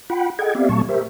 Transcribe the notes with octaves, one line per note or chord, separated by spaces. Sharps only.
F4 F#5 G5 B5
G#4 A4 D#5 F#5 G5 G#6
B3 C4 G4 D5 E5 F5
A#2 F#3 A3 A5 C#6
G4 A#4 C5 E5